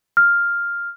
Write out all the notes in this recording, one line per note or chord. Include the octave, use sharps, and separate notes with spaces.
F6